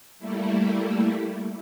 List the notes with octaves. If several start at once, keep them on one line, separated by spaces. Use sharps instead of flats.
G3 A3 A#3 E4